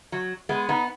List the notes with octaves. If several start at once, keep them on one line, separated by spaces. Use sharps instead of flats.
F#3
G#3 B3
B3 D#4